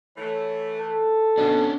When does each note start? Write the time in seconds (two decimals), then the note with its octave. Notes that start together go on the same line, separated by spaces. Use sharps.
0.17 E3 A3 C#5
0.80 A4
1.38 B2 C#4 D4